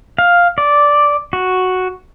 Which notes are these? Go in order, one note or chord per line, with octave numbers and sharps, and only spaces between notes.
F5
D5
F#4